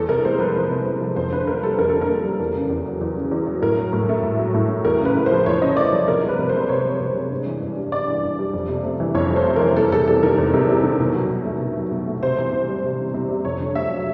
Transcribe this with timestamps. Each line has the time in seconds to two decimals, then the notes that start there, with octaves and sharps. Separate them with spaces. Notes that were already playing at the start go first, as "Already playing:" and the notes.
Already playing: E2 A4
0.09 C3 A#4
0.25 G#3 C5
0.40 F3 B4
0.55 E2
0.71 C3
0.86 G#3
1.01 F3
1.16 F2 C5
1.32 D3 B4
1.47 A#3 A#4
1.63 G3 A4
1.78 F2 A#4
1.89 D3 A4
2.01 A#4
2.09 A#3
2.24 G3
2.40 E2
2.55 C#3
2.70 E2
2.86 F#3
3.01 E2
3.16 C#3
3.31 E2
3.47 F#3
3.62 A2 A#4
3.77 F#3
3.93 A2
4.09 A3
4.23 A2
4.39 F#3
4.54 A2
4.70 A3
4.85 E2 A#4
5.00 C#3 B4
5.16 A3
5.26 C5
5.31 F3
5.46 E2 C#5
5.61 C#3 D#5
5.77 A3 D5
5.93 F3
6.07 C3 A#4
6.23 F3
6.29 B4
6.39 C3
6.49 C5
6.55 G#3
6.69 C3 C#5
6.84 F3
7.01 C3
7.15 G#3
7.30 G2
7.46 E3
7.62 G2
7.77 G3
7.92 G2 D5
8.08 E3
8.23 G2
8.39 G3
8.53 F2
8.69 C3
8.84 A3
9.00 E3
9.15 F2 C#5
9.31 C3
9.36 C5
9.46 A3
9.56 E3 A#4
9.76 E2 A4
9.92 C3 A4
10.08 G3 A4
10.23 D#3 A#4
10.38 E2
10.53 C3
10.68 G3
10.84 D#3
11.00 B2
11.15 F#3
11.31 B2
11.45 A3
11.61 B2
11.76 F#3
11.91 B2
12.07 A3
12.23 C3 C5
12.38 E3
12.52 C3
12.68 G3
12.84 C3
12.99 E3
13.14 C3
13.29 G3
13.45 F2 C#5
13.60 D3
13.75 A3 E5
13.91 F#3